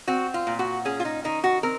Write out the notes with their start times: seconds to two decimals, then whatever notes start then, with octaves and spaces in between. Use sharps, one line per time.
0.08 C4 F#4
0.34 F4
0.47 A#2
0.59 F#4
0.85 C#4 G#4
1.00 F4
1.05 D#4
1.24 D#3 D#4
1.44 F#4
1.63 C4 A#4